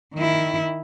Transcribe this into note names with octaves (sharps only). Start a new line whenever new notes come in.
D#3 E4